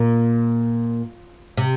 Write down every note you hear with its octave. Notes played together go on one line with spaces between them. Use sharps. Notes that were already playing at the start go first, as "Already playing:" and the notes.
Already playing: A#2
C3